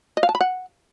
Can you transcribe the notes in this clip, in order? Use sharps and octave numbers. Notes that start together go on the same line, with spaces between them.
D#5
F5
A5
B5
F#5